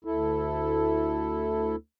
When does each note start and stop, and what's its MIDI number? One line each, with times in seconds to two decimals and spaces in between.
0.05 1.76 38
0.05 1.76 64
0.05 1.76 69